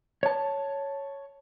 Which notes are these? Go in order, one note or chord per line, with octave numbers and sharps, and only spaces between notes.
C#5 A5